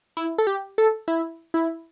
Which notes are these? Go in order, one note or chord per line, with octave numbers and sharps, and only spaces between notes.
E4
A4
G4
A4
E4
E4